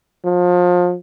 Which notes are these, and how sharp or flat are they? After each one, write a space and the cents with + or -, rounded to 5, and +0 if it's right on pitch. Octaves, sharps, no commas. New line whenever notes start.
F3 +30